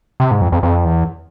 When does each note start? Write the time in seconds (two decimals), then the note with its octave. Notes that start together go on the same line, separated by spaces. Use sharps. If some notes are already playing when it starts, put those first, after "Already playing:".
0.20 C3
0.31 G#2
0.41 F2
0.52 F2
0.63 F2
0.84 E2